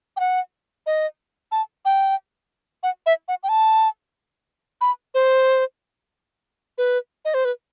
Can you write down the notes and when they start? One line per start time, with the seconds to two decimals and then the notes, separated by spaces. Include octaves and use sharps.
0.17 G5
0.20 F#5
0.86 D#5
1.52 A5
1.85 G5
2.83 F#5
3.06 E5
3.28 F#5
3.43 G5
3.49 A5
4.81 B5
5.14 C5
6.78 B4
7.25 D#5
7.34 C5
7.45 B4